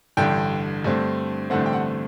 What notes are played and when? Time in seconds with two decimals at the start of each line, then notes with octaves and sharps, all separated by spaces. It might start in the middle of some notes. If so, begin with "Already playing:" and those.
0.17 A1 G2 D3 G5
0.84 G2 D3 A3 C4
1.50 A1 G2 D3 A3 C4 F#5
1.66 G5
1.73 F#5